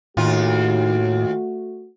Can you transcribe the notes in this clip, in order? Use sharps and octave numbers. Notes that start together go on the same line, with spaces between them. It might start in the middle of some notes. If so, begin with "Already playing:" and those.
D#2 A2 A3 F4 F#4